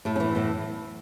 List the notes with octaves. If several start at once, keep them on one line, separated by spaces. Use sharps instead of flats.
A2 A3
C#4
E3 B3
A2 B3